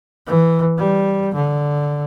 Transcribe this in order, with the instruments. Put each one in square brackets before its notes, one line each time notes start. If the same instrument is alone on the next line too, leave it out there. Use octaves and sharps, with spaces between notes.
[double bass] E3
G3
D3